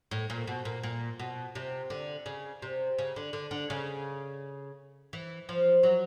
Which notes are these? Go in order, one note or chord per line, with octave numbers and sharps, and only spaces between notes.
A2
A#2
B2
A#2
A#2
B2
C3
D3
C#3
C3
C#3
D3
D3
D3
C#3
E3
F3
F#3